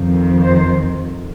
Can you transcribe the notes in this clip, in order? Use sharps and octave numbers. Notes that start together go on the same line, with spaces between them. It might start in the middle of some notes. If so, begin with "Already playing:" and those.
Already playing: F2 D#3
C5